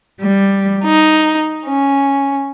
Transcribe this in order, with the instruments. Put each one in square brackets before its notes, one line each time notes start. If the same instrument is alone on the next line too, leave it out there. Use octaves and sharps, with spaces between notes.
[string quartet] G3
D#4
C#4